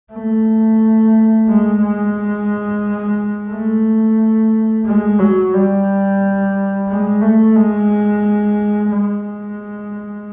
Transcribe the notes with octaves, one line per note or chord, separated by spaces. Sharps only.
A3
G#3
G#3
A3
G#3
F#3
G3
G#3
A3
G#3
G#3